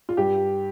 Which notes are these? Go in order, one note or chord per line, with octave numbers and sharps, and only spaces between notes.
F4
G2 G4